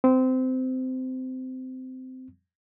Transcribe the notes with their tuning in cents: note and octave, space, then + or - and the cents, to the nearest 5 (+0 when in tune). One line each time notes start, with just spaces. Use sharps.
C4 -20